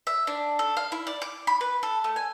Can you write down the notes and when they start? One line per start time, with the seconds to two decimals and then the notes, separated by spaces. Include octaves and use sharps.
0.07 E5
0.27 D4
0.59 A4
0.77 F5
0.92 E4
1.07 D5
1.22 D6
1.47 B5
1.61 B4
1.83 A4
2.04 A3
2.16 G#5